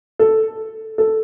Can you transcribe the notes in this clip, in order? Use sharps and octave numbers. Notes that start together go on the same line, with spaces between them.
A4
A4